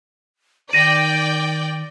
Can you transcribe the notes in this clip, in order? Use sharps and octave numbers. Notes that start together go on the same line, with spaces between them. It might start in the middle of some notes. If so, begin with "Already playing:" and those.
D#3 D5 G5 A#6 D#7